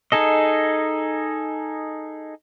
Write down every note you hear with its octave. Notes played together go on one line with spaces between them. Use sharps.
D#4 G#4 A4 D#5